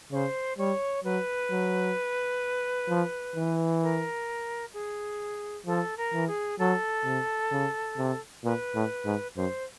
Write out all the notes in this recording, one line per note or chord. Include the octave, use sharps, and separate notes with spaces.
C#3 C5 C#5
G3 C#5
F#3 B4
F#3
F3
E3
A#4
G#4
F3 A4
A#4
E3
G#4
F#3 A4
C3
C#3
C3
A#2 B4
A2
G#2
F#2 C5